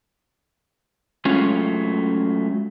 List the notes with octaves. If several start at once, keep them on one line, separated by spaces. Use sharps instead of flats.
F#3 G#3 A3 C#4 F4